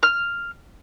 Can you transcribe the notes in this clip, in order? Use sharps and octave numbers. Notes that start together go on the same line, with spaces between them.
F6